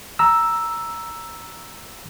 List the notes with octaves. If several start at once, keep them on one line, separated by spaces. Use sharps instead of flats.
A#5 E6